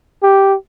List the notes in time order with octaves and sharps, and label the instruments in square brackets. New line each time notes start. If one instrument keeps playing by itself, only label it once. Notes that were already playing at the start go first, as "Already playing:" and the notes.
[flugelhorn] G4